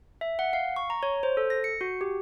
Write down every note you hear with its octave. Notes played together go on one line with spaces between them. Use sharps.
E5
F#5
F5
C#6
A#5
C#5
C5
A4
A#6
C#7
F#4
G4